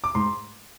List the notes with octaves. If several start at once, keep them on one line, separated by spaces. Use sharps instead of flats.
D6
G#2 C6